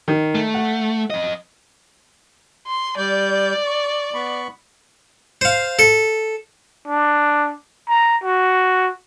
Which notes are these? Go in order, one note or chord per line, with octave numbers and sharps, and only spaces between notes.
D#3
A3
F#5
F2 D#5
C6
G3 D5 G6
C#6
B3 B5 C#6
C5 F5
A4
D4
A#5
F#4